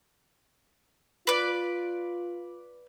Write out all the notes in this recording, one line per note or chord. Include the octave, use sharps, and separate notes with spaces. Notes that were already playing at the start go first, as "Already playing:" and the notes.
F4 B4 D5